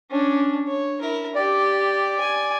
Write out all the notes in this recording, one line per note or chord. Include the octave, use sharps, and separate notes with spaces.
C#4 D4
C#5
E4 A#4
G4 D5
G#5